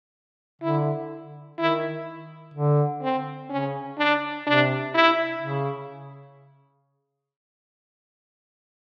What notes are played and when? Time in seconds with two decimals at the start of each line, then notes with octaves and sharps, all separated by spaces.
0.62 D3 E4
1.58 D#3 E4
2.54 D3
3.02 C4
3.50 C#3 C#4
3.98 D4
4.47 C3 D4
4.95 E4
5.42 C#3